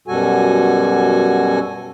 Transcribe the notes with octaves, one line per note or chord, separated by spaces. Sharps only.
F#2 B2 G3 F#4 A4 G#5